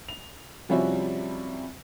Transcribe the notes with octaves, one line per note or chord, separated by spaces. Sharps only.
F7
C3 F3 G3 C#4 E4 F#4